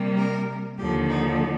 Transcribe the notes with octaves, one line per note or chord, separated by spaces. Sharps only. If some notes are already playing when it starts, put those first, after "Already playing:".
Already playing: C3 G3 A#3
A#4
D#2 D3 F3 G4
D#4